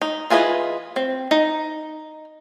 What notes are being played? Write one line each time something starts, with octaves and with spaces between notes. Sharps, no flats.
D#4
E3 F4 G#4 B4 D#5
C4
D#4